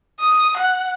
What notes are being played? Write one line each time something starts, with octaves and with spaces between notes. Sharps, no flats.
D#6
F#5